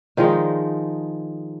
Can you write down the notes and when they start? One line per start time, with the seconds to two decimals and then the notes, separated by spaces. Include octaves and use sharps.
0.17 D#3 F3 G#3 D#4